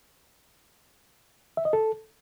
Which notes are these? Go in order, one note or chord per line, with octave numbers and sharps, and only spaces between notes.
E5
D#5
A4